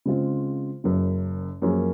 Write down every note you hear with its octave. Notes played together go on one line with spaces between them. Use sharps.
C#3 G#3 C4 F4
F#1 F#2 C#3
F#2 F3 A#3 C#4 G#4